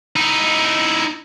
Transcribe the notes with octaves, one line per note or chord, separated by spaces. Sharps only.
D#4 E4